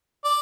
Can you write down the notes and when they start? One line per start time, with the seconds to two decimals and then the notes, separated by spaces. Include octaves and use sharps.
0.24 D5